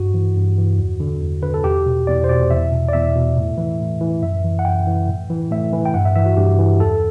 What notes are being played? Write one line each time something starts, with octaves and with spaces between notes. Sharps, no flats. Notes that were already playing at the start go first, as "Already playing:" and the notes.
Already playing: G2 F#4
E3
G2
E3
E2
D3
E2
D3 B4
A4
E2 G4
B2
E2 D5
C5
B2 D5
E2 E5
B2
D5
E2 E5
B2
A2
E3
A2
E3
F#2 E5
E3
F#5
F#2 G5
E3
A2
E3
A2 E5
E3
G5
G2 F#5
E5
E3 E5
F#4
G2 G4
E3
E2 A4